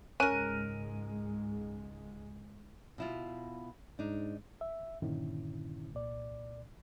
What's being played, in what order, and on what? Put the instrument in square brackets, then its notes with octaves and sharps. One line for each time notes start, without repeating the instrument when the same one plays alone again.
[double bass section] C#2 G#2 G#3 [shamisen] C#4 [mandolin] A#4 F#6 [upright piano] D#7
[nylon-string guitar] B2 E4 F4
[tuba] G#2 [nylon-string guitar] D4 D#4
[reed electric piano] E5
G2 A#2 D3 D#3 C#4 E4
C2 A#2 D5